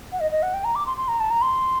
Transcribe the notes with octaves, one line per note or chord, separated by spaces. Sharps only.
F#5
D#5
D#5
F#5
G5
A#5
D6
C6
C6
A#5
A5
A#5
C6